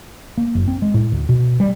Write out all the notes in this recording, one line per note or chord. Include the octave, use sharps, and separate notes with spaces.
A#3
F#1
C4
G#3
A2
D2
B2
G3